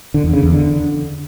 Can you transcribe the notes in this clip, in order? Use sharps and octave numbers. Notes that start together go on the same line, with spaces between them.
D3
E2
C#3
E2
D3